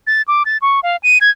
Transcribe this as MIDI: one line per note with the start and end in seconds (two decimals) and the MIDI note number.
0.07 0.22 93
0.28 0.43 86
0.46 0.57 93
0.62 0.80 85
0.83 0.97 77
1.03 1.18 99
1.21 1.30 92